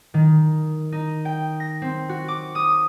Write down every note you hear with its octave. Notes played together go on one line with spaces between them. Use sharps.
D#3
D#4
G5
A#6
C4
F#4
D6
D#6